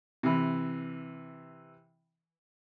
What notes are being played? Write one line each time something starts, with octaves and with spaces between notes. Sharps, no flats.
C3 E3